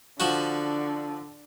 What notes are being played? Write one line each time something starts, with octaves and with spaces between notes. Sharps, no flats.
D3 F3 F#4